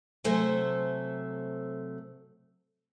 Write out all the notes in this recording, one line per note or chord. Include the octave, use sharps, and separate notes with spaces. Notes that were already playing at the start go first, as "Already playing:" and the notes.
C3 F#3 A3 A4 C5 G#5